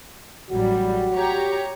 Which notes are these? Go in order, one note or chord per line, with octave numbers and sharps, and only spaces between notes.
A1 F#3 G3 F#4
G4 C#5 A#5